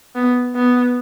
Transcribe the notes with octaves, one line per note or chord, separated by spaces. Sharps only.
B3
B3